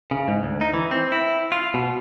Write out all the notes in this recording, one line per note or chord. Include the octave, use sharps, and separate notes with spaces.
C#3
G#2
D2
D#4
E3
C4
E4
F4
B2